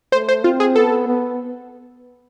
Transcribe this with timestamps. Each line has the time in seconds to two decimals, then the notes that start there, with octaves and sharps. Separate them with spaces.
0.12 A3 C5
0.29 C5
0.44 C4 F4
0.60 G#4
0.76 B3 A4
1.07 B3